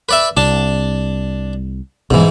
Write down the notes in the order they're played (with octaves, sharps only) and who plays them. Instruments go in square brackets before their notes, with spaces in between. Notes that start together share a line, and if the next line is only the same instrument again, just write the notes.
[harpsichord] B4 D5 E5
[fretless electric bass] C2 [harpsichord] D4 A5
[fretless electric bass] B1 B2 G#3 [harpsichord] G#2 E3